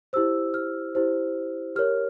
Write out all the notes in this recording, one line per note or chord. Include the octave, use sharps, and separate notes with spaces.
E4 G4 C5 E6
F6
E4 G4 C5
G4 A#4 C#5 F6